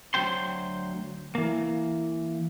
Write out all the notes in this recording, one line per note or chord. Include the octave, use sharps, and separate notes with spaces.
D2 F#3 C5 G5 C6
E3 A#3